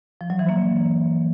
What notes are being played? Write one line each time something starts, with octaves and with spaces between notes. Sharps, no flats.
F3
F#3
E3
A#3